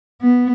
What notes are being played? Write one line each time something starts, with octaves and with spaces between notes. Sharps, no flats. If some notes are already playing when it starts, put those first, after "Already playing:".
B3